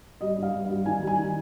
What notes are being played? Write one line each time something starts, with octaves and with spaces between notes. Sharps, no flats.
G3 D#5
G2
F5
G2
F5
G3
D#3 G#5
G3 G#5
D#3